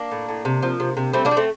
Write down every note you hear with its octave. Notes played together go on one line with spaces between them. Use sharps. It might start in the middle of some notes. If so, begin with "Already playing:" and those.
Already playing: A#3 D4
A2
A2
C3
F3
C3
C3
G3 A3 C4
A#3 D4
G3
A3 C4